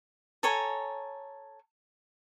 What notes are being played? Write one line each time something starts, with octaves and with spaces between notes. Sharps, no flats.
A4 C#5 G#5 A#5